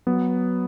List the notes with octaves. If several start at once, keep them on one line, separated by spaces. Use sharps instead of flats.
F#3 B3